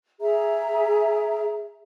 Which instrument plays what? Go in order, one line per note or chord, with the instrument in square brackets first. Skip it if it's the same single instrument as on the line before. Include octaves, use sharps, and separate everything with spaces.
[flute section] G#4 E5 A#5